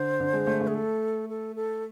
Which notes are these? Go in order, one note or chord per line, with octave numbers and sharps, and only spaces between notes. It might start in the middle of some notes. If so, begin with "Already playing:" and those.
Already playing: D3 C5
D3
G#3
A3
A3
G#4
A4
A4
A4